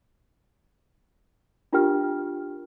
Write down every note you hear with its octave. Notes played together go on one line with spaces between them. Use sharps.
D4 F4 G4 A#4 G5 F6